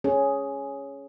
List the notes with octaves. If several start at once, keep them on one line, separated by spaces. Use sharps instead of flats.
C#4 G#4